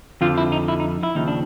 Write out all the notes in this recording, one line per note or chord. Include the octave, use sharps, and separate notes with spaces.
F2 D3 F3 F4
E4
D#4
E4
D#4
E4
D#2 C#3 F3 D#4
D4